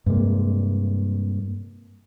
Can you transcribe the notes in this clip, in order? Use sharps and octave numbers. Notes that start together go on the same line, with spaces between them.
G2 C3 G#3 A#3